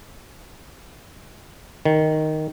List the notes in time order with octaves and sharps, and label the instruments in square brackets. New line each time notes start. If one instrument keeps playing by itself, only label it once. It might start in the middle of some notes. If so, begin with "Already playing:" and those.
[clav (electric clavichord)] D#3